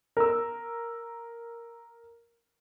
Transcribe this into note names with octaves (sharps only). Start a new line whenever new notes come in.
A#4 E6